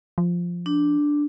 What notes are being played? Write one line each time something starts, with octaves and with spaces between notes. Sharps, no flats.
F3
D4